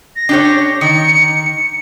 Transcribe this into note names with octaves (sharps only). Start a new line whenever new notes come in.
A#6
D4 G4 C#5
D#3 C#7